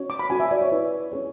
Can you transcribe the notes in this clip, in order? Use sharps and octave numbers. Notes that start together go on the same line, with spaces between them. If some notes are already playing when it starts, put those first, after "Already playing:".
Already playing: C#4 F#4 C#5
D6
B5
C#4 F#4 A4 G#5
E5
D5
C#5
C#4 E4 B4
C#4 G#4 C#5